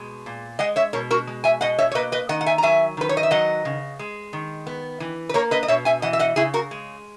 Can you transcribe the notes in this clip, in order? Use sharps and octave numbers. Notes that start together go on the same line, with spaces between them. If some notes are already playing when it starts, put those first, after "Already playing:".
Already playing: B2 G#3
A#2
G#3 D#5 F#5
C#5 E5
B2 A#4 C#5
F#4 A#4
G#3
E5 G#5
B2 D#5 F#5
C#5 E5
C#5
A#3 B4 D#5
B4 D#5
D#3 D#5 F#5
F#5
E5 G#5
A#5
F#3 E5 G#5
D#3 B4
C#5
D#5
E5
F#3 D#5 F#5
C#3
G#3
D#3
B3
E3
B4
A#3 A#4 C#5
B4 D#5
D#5
B2 C#5 E5
E5 G#5
E3 D#5 F#5
E5
D#5 F#5
C#3 E4 G#4
F#4 A#4
G#3